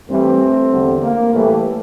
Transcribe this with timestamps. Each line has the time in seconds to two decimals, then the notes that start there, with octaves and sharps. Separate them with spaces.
0.08 G2 E3 G3 A3 C4
0.72 E2 D3 G3
1.02 A#3
1.33 A2 E3 G3 A3